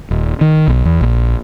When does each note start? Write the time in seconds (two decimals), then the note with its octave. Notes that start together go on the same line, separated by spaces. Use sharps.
0.11 D#1
0.41 D#3
0.68 B1
0.85 E2
1.01 A#1